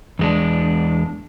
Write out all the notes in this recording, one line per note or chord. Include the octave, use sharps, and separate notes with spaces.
E2 G#3 D4